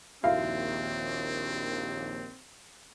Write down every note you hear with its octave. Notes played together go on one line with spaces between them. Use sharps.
A#1 D#2 C4 E4 F#4 E5 F5